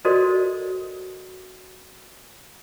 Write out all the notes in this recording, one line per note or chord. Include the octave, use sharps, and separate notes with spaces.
F#4 A4 A#4 C5 D5 D#5